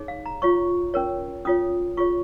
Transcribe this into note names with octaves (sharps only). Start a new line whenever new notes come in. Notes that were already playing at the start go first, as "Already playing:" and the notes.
Already playing: D#4 G#4 C#5
F5
A#5
F4 C#5 C#6
C#4 A#4 C#5
C#4 F4 C#5 D#6
F4 G#4 C#5 C#6